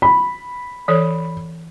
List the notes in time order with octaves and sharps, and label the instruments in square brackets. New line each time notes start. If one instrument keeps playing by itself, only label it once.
[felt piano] B5
[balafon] E3 A4 C#5